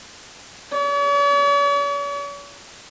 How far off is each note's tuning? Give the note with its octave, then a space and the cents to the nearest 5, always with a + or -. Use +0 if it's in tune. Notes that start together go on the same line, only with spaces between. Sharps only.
C#5 +45